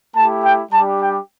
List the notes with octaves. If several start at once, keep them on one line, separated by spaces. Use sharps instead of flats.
A3 E4 G4 A5
G5
G3 D4 G4 A5
G5